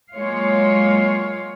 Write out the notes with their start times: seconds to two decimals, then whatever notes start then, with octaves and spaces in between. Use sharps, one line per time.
0.13 F#3 G#3 A#3 F4 C#5 F5